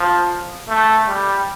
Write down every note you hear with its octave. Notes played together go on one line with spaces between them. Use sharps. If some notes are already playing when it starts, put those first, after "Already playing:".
Already playing: F3
A3
G3